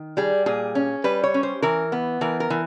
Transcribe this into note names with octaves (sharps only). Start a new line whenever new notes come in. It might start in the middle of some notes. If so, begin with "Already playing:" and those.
Already playing: D#3
G3 G#4
A#2 G#4
C#4
G3 B4
C#5
C#4
C5
E3 A#4
B3
E3 A#4
A#4
E3